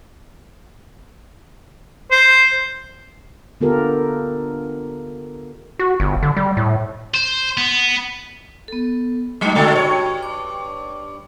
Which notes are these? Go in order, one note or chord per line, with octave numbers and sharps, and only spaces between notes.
C5
D3 B3 F4 G4 A4 A#4
F#4
G1
D3
G3
A2
C5
B3
B3 A4
F#3 G#3 A3 D#4 D6
B2 D3 F#4 A4 G5 C#6
G2 C#5
D6